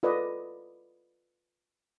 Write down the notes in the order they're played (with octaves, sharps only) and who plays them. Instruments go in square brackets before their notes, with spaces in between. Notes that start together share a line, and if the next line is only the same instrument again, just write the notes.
[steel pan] F4 A4 B4 D5 D#5